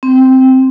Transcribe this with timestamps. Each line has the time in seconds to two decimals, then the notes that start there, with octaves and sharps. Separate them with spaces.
0.03 C4